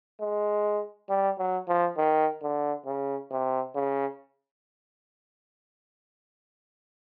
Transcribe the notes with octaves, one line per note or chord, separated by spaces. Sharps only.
G#3
G3
F#3
F3
D#3
D3
C#3
C3
C#3